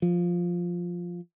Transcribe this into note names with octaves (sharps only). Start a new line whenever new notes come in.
F3